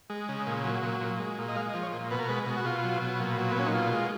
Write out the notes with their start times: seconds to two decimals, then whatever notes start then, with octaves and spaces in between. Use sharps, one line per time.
0.10 G#3
0.29 C#3
0.46 A#2
0.64 F#3
0.82 A#2
1.01 A#2
1.20 G#3
1.38 A#2
1.48 D#5
1.55 G#3 F5
1.69 D#5
1.74 F3
1.83 C#5
1.92 A#2
2.11 B2 B4
2.19 A#4
2.29 G#3 B4
2.47 B2
2.57 F#4
2.65 B2 F4
2.84 F#3
3.01 B2
3.20 A#2
3.37 F#3
3.52 B3
3.56 A#2 C#4
3.66 D#4
3.74 B2 F4
3.93 G#3